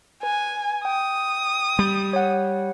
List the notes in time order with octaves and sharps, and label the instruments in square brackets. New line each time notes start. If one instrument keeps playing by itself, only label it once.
[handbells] B4 [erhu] G#5
[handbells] G5 [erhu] D#6
[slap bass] G3
[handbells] C#5 F#5